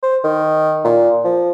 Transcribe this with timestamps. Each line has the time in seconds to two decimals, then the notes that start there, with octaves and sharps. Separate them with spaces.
0.03 C5
0.24 D#3
0.84 A#2
1.25 F3